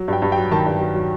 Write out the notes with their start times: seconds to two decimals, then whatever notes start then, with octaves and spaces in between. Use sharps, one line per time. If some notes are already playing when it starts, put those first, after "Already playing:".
Already playing: F#3
0.08 G2 G5
0.22 G2
0.32 G5
0.37 F#3
0.51 D#3 A5
0.66 G2
0.81 F#3
0.95 F#3